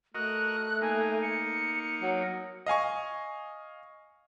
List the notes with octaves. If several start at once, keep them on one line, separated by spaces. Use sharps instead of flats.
A3 F#4 A#4 D#5 F#6
A#3 D#4 G#5
C#7
F#3
D#5 F5 G#5 C#6